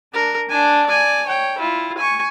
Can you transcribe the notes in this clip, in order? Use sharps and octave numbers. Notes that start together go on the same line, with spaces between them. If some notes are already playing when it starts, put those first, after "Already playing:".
D4 A#4
D4 G#5
D5 G#5
C#5 G5
E4 F4
G#5 C#6